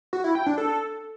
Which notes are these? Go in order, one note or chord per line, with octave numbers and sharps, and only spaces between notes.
F#4
E4
G5
D4
A4